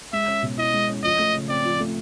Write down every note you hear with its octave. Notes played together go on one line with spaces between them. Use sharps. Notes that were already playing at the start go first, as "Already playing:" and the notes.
G#3 E5
C#4
B2
E4 D#5
G#3
C#4
F3 D#5
A3
C#3
C4 D5
F3
A3